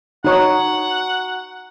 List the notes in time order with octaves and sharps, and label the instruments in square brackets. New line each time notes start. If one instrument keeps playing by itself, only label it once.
[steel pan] D#4 C#5 [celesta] F#4 A#5 C#6 [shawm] F#5